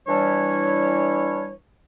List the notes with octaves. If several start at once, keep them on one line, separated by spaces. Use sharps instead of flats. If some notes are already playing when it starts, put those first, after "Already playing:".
E3 G3 D4 C#5